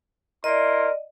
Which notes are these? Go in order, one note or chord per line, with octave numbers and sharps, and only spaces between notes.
E4 A#4 D5 D#5 C6